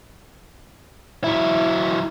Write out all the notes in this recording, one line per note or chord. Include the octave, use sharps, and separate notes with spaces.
F#3 E4